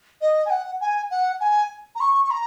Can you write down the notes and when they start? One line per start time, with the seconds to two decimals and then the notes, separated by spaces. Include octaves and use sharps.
0.21 D#5
0.45 G#5
0.50 F#5
0.80 G#5
1.10 F#5
1.40 G#5
1.95 A#5
2.00 C#6
2.24 C#6
2.30 A#5